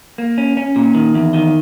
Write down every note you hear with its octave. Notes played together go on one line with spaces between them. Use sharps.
A#3
C#4
C#4
A#2
D#3
E2
D#3